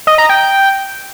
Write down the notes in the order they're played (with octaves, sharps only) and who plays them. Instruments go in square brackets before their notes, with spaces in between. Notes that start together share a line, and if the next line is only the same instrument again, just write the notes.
[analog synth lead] D#5
A#5
G5